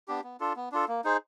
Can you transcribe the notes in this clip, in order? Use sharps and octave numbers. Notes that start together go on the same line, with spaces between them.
B3 D4 G4
B3
D4 F4 A4
B3
D4 F4 A4
A#3
D#4 G#4 C5